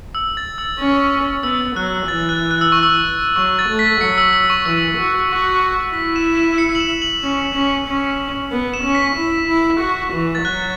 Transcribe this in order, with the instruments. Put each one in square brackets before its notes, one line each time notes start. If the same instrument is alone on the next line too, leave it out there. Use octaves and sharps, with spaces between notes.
[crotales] E6
A6
E6
[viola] C#4
[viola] B3 [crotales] E6
[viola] F#3 [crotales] F#6
[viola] E3 [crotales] A6
[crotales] F#6
F#6
E6
C#6
E6
[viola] F#3 [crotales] C#6
[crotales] A6
[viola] A3
[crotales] B6
[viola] F#3 [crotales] C#7
[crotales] E6
E6
C#6
[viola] E3 [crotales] E6
[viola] F#4
F#4
[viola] E4 [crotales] B6
[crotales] E7
E7
C#7
F#7
E7
F#7
[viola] C#4
C#4
C#4
B3
[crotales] E7
[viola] C#4
[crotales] B6
[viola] E4
E4
F#4
E3
[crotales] A6
[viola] F#3 [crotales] F#6